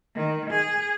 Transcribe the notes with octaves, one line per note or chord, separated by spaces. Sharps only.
D#3
G#4